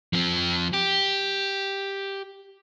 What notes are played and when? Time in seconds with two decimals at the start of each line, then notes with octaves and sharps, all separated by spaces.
0.13 F3 C4
0.73 G4